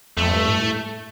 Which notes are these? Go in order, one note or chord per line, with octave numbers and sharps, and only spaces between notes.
F2 A3
G2
A2